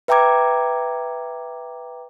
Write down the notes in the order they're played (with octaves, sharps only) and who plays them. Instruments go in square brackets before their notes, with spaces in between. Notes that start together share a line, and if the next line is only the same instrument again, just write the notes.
[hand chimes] B4 E5 G5 A#5 D6 G#6